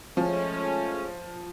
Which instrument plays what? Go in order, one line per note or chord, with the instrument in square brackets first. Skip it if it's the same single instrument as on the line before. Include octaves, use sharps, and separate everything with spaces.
[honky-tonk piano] F3 [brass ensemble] G#3 A3 C#4